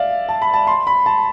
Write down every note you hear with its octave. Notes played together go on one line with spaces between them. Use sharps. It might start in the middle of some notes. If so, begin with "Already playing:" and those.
Already playing: D5 E5 F5
A5
B5
A5
C6
B5
A5